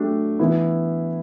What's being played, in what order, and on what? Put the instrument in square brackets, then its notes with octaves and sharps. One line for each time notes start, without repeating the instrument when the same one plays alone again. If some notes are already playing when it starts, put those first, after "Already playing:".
Already playing: [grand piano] F#3 A3 D4 G4
E3 B3 E4